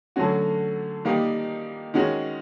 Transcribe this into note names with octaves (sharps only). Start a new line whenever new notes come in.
D3 F#3 A3 C#4 F#4
D#3 G3 A#3 D#4 G4
D#3 G#3 C#4 F#4